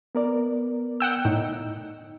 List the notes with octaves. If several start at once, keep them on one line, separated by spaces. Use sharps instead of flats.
B3 A#4 D5
F#5 G5 E6
A2 D#4